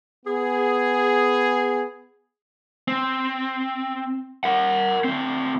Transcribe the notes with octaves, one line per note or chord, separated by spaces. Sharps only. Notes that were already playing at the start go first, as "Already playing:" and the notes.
B3 G#4
C4
A#4 F#5
D2 C4